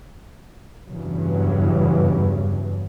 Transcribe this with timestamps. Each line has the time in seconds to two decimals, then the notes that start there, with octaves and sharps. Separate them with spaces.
0.89 E2 G2 C#3 E3 F#3